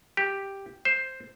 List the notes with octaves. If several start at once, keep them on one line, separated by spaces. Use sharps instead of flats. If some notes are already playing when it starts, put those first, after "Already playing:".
G4
C5